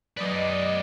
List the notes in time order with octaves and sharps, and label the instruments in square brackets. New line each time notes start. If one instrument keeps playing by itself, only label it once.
[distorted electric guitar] F#2 B4 [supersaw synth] D5 D#5